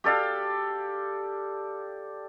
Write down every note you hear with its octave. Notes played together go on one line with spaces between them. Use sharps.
G4 A4 D5 F5